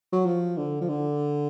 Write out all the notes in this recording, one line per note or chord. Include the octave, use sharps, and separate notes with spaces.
F#3
F3
D3
F3
D3